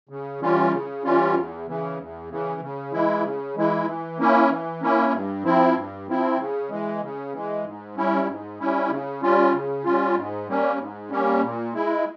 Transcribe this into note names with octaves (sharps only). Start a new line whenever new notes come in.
C#3
E3 G3 C#4 F4
C#3
E3 G3 C#4 F4
E2
C#3 E3
E2
C#3 E3
C#3
E3 G#3 E4
C#3
E3 G#3 E4
E3
A#3 C#4 E4
E3
A#3 C#4 E4
G2
F3 C4 E4
G2
F3 C4 E4
C#3
E3 G#3
C#3
E3 G#3
G#2
G3 C#4 E4
G#2
G3 C#4 E4
C#3
G3 C#4 F4
C#3
G3 C#4 F4
G#2
G3 A#3 C#4
G#2
G3 A#3 C#4
A#2
G#3 E4